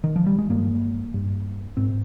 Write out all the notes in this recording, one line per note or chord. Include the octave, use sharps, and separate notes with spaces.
D#3
F3
G3
G#3
G2 A#3
G2
G#2 C4